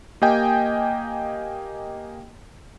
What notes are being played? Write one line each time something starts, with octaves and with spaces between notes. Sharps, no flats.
A#3 G4 D#5 G5 G#5